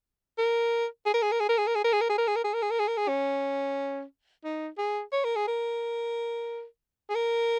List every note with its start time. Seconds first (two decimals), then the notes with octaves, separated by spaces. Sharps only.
0.38 A#4
1.06 G#4
1.14 A#4
1.22 G#4
1.32 A#4
1.40 G#4
1.49 A#4
1.58 G#4
1.67 A#4
1.75 G#4
1.84 A#4
1.93 G#4
2.01 A#4
2.09 G#4
2.18 A#4
2.28 G#4
2.36 A#4
2.44 G#4
2.54 A#4
2.62 G#4
2.71 A#4
2.79 G#4
2.88 A#4
2.97 G#4
3.08 C#4
4.44 D#4
4.78 G#4
5.12 C#5
5.25 A#4
5.36 G#4
5.48 A#4
7.10 G#4
7.15 A#4